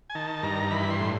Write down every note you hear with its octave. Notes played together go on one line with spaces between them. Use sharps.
G#5
D#3 A5
G2 A#5
E3 B5
C6
A2